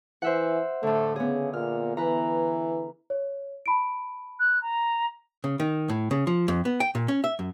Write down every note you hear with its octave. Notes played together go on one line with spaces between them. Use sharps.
E3 C5 E5 F#5
A2 D3 A3
C#3 B3 G#4
A#2 F6
E3 B4 A#5
C#5
A5 B5 D7
F#6
A#5
C#3
D#3
A2
C#3
F3
F2
B3
G5
A#2
C#4
E5
F#2